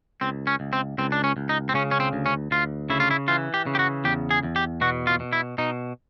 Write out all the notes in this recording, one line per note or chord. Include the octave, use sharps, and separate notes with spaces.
C#2 C4
C#4
C#2
C4
C#2 C4
D4
C#4
C#2
D#4
C4
C#3 C#4
C#4
C4
D2
C#4
D2 F4
C#3 E4
F4
E4
E3 F4
G4
C#3
G4
F#4
E2 G4
G#4
E2
G4
B2 F#4
F4
B2
E4
B2 D#4